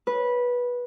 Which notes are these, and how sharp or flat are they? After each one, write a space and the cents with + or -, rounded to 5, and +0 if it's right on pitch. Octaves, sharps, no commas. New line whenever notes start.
B4 -15